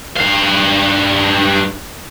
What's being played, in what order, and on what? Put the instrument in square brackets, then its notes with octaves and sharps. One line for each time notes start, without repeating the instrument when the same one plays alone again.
[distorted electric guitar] G2 F5